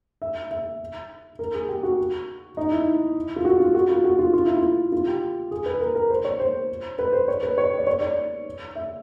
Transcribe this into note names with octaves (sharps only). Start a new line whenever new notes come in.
E5
E5
A#4
G#4
G4
F#4
D#4
E4
F4
F#4
F4
F#4
F4
F#4
F4
F4
E4
F4
F4
G4
G#4
B4
A#4
A#4
C5
C#5
C5
B4
C5
C#5
B4
C#5
D5
C#5
D5
E5